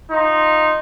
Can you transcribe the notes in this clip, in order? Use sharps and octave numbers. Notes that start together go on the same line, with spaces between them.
D#4 F4 C6